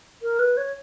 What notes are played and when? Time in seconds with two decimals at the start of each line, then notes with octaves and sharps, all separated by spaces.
0.22 A#4
0.39 B4
0.57 C#5